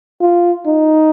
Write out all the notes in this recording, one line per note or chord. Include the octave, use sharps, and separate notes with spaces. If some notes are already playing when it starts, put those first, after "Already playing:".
F4
D#4